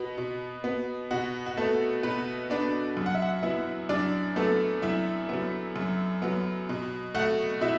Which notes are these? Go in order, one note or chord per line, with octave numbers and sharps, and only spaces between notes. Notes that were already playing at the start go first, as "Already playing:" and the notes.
Already playing: B2 B3
B2
B3
B2 F#4
F#4
A3 B3 A4
B2 B3 B4
B3 D4 D5
F#2
F#5
E5
F#4 F#5
F#3 B3 E4 E5
F#2 D4 D5
F#3 A3 B3 A4
F#2 E4 E5
F#3 B3
F#2
F#3 B3
B2
A3 F#4 F#5
B2 E4 E5